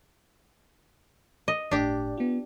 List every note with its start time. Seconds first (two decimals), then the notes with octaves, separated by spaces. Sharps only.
1.48 D#5
1.71 G1 A2 D4 G4 D5
2.18 B3 F4